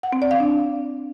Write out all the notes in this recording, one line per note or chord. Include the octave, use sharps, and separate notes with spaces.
F#5
C4
D5
F5
D4